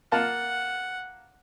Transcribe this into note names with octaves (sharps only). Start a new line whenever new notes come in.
A#3 F4 F#5 A5